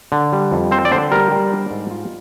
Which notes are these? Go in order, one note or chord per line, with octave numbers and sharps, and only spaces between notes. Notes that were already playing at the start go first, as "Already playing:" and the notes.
D3
G3
F2
C4 C5
D5
D3 C5
G3 A#4
G3
D4
G#2
F4